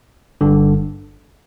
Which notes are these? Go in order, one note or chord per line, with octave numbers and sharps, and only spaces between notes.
G1 G2 D3